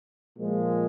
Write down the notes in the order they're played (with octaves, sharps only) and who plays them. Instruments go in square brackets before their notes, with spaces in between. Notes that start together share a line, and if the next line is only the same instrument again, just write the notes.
[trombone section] A#2 F3 G#3